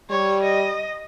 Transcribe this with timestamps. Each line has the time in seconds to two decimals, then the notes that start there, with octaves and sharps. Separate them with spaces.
0.10 G3 C#5
0.43 D#5